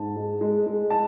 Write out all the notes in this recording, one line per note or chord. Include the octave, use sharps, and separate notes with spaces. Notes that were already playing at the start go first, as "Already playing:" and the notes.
Already playing: G#2 A5
G#3
G#3
G#3
A5